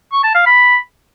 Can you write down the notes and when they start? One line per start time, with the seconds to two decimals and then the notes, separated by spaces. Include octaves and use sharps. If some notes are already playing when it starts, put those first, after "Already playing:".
0.12 C#6
0.23 A5
0.35 F5
0.46 B5